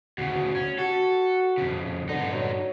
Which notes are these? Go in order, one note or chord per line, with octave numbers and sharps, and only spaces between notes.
D2 C#3 F#4
C#4
F#4 A4
F2 C#3
G2 D3 D#4
F#3